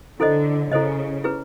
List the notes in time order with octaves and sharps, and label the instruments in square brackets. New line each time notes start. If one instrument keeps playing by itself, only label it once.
[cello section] D3 [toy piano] E4 A4 C5 D#5
[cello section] C#3 [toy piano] E4 A4 C5 D#5
[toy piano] E4 G#4 B4